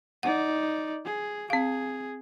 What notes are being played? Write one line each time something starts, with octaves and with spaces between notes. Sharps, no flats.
D#4 D5 F#5
G#4
C4 G#4 F5